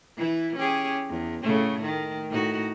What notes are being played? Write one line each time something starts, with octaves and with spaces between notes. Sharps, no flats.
E3 E4
C#4 G4 G#4
E2
A2 C#3 A3
D#3
A2 D#4 F#4